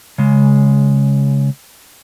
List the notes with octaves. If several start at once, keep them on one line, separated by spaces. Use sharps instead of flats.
C#3 G#3